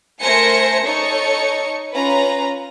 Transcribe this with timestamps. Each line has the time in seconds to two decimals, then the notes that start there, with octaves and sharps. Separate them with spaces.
0.22 A3 A#4 C5 G#5 A#6 C#7
0.85 D#4 A4 C#5 C#6 C#7
1.94 C#4 F4 B4 A#5